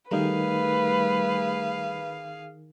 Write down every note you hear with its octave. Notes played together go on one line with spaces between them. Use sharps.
D#3 G3 A3 D#4 G#4 A#4 B4 F5